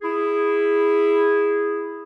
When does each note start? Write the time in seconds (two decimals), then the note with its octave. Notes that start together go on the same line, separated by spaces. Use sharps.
0.02 E4 G#4